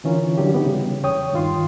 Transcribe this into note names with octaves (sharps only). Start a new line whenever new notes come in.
D3 E3 C#4 F4 A#4
D3 F#3 E4 G4
B3 D#4 G4
C#3 G3
E2 C#5 G5 D#6
G2 D#3 F4 C6